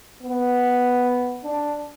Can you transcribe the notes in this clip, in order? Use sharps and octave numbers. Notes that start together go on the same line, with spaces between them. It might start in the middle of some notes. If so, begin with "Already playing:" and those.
B3
D4